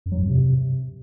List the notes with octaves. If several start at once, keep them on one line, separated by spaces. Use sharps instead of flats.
F#2
F#3
G2
F2
C3